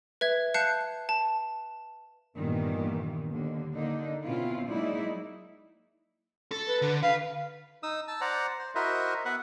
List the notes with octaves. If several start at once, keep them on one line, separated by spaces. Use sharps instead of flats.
B4 E5 G#6
F5 A5 F#6 G6 C7 C#7
A5
G2 A#2 D#3 E3 B3
D#2 D3 A#3
D3 A#3 D4 D#4
B2 C4 C#4 E4 F4
F#3 G#3 A#3 D#4 E4 D5
A4
B4
D3
B4 F5
D#4 D#6 E6
A5 E6
C5 D5 F#5 A#5
C5
E4 F#4 A#4 C5 D#5 E5
B3 B4 E5 F#5